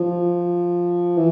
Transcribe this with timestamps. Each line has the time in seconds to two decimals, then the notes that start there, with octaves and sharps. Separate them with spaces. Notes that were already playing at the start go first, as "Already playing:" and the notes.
Already playing: F3
1.17 E3